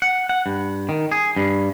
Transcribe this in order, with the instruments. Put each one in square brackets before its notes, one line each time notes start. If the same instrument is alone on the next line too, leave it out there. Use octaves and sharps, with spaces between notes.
[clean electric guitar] F#5
F#5
G2
D#3
G#4
G2